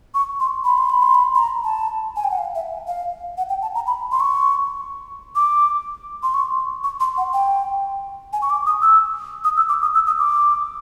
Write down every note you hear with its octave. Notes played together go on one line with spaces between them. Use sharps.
C#6
C6
B5
C6
B5
C6
B5
B5
A#5
A5
G#5
G5
F#5
F5
E5
F5
F#5
G5
A5
A#5
B5
C6
C#6
D6
C6
C#6
C#6
C6
F#5
G5
G#5
C#6
D6
D#6
E6
D#6
E6
D6
D#6
E6
D#6
D6